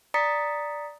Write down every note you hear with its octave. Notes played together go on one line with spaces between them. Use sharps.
D5 A#5 D#6 A6 B6 C#7